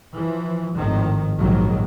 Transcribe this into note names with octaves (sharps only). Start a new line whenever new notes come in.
E3 F3
G#1 A2 D#3 F3
A#1 D#2 G#2 D#3 F#3